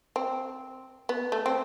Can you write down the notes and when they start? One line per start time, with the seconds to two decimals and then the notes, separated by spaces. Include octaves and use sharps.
0.16 C4
1.09 B3
1.32 A3
1.46 C4